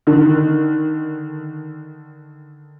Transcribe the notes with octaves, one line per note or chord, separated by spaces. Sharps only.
D3 D#3